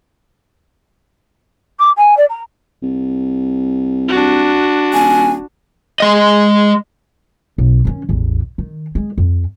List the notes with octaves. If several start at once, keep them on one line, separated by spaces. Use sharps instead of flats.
D6
G#5
D5
A#5
C2
D4 F#4
D#1 G#5
G#3 D#5
B1
D#3 C#4
A1 E2
D#3
G#3
F2